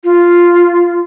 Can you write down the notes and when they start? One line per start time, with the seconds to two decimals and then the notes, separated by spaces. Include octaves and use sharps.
0.04 F4